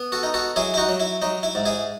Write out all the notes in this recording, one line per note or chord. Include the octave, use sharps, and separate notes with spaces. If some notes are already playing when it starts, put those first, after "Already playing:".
Already playing: B3
F#4 A4
D#4
F#4 A4
F#3 E4 G#4
E4
D#4 F#4
F#3
E4
F#3 D#4
E4
G#2
E4 G#4